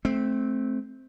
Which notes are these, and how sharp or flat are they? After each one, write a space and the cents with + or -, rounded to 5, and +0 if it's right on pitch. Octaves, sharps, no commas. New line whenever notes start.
A3 -20 C4 +0